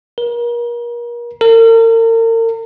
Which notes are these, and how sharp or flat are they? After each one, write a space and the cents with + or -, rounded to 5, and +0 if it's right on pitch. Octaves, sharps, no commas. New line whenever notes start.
A#4 +35
A#4 -40